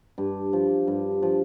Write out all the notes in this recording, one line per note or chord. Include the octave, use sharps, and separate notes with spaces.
G2
F3
G2
F3